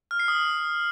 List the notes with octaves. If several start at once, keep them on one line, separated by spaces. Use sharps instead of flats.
F6
C7
D#6